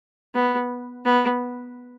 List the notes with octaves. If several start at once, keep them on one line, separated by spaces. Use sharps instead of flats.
B3
B3